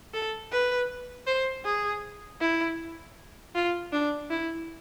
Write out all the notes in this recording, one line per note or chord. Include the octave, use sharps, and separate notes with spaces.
A4
B4
C5
G#4
E4
F4
D4
E4